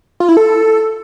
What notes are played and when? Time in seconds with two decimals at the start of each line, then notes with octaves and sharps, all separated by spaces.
0.20 F4
0.29 E4
0.37 A4